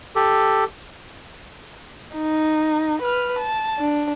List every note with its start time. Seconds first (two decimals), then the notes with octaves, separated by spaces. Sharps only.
0.16 G4 A4
2.15 D#4
3.02 B4 F6
3.38 A5
3.79 D4